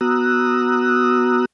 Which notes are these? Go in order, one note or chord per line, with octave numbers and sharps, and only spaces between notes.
B3 F#4 A#5 D#6 E6 F#6